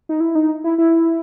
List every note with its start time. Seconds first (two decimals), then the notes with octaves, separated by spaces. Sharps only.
0.09 D#4
0.20 E4
0.35 D#4
0.64 E4
0.78 E4